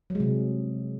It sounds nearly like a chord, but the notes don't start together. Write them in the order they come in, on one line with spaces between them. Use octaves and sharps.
F#3 G#3 C3